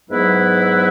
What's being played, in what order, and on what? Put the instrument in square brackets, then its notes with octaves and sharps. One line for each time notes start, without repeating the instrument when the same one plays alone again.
[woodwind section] G#2 F#3 B3 E4 B4